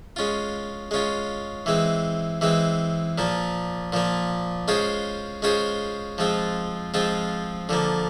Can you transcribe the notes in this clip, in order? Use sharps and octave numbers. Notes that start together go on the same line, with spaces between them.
G#3 C#4 F4
G#3 C#4 F4
E3 G#3 C4
E3 G#3 C4
A#2 F3 A#3
A#2 F3 A#3
G#3 C#4 F4 G#4 C5
G#3 C#4 F4 G#4 C5
F3 G#3 C4 F4
F3 G#3 C4 F4
D3 F3 A#3